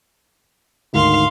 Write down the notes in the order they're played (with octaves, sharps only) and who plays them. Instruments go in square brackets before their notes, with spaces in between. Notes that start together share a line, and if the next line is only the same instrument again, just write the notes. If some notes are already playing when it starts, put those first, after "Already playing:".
[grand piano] D2 G#2 D#3 [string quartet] F5 C6